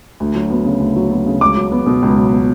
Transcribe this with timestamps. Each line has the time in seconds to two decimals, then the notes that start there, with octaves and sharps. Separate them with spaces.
0.20 D2
0.35 F#3
0.50 B3
0.65 C#3
0.80 D2
0.96 F#3
1.11 B3
1.26 C#3
1.41 C#2 D6
1.57 F#3
1.72 B3
1.86 B2
2.02 C#2
2.18 F#3
2.33 B3